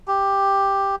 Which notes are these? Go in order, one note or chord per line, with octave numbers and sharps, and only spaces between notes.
G4